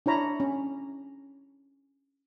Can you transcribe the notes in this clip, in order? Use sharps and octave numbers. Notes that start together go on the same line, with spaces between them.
D4 E4 C#5 A#5 B5
C#4